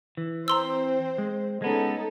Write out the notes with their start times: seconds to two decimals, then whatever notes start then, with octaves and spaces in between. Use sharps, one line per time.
0.17 E3
0.48 C4 C5 A#5 C6 E6
1.18 G#3
1.62 G#3 B3 C#4 D#4 A4